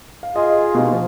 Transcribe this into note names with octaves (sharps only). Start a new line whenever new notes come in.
F5
F4 G#4 D#5
B2 A#3 D#4
F3